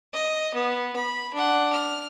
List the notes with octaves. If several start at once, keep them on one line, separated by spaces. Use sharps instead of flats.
D#5
B3
B5
D4 F#5
F6